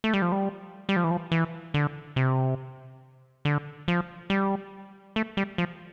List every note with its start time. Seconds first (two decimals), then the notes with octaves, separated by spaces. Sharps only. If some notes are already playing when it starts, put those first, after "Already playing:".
0.04 A3
0.13 G3
0.22 F3
0.32 G3
0.89 G3
0.96 F3
1.04 E3
1.11 F3
1.32 E3
1.74 D3
2.16 C3
3.45 D3
3.88 F3
4.30 G3
5.16 A3
5.37 G3
5.58 F3